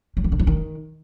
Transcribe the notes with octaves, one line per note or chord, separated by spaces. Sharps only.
F#3
E3
D3
E3
D#3